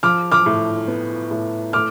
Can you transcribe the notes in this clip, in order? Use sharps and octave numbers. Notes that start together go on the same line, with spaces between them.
F3 D6 F6
D6 F6
A2
B3
A2
A3 D6 F6